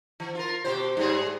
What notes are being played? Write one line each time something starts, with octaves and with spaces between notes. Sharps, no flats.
E3
F4 A#4
B2 G4 C5
G#2 G3 G#4